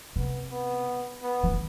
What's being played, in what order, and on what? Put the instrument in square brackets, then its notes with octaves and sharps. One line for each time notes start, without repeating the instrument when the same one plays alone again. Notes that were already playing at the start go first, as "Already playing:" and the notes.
[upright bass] C3 [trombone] B3
[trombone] B3
B3
[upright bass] E3
D#3